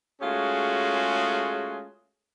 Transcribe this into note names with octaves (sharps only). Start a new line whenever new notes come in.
G#3 A3 C#4 F4 F#4 G#4